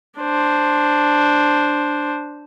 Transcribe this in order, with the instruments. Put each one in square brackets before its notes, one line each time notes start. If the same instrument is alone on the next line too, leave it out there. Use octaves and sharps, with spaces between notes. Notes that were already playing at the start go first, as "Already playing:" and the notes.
[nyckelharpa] D4 C5